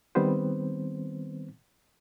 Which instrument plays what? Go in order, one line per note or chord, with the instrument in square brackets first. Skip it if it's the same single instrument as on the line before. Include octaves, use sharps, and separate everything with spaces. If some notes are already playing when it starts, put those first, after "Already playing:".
[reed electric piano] D#3 G3 B3 C4 B4 C5